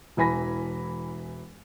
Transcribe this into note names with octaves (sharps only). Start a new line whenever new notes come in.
E1 E3 G#5 B5 A#6